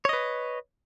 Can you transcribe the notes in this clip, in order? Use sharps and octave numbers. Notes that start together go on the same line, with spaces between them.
B4 C#5 D#5